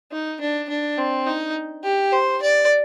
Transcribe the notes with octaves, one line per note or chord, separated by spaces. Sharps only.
D#4
D4
D4
C4
D#4
G4
C5
D5